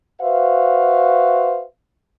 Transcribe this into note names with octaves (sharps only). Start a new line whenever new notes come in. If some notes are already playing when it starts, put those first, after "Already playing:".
F#4 B4 C5 E5 F5